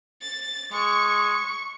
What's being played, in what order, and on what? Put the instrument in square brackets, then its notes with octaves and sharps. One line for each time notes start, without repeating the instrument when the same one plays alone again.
[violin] A6
[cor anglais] G#3 [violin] C#6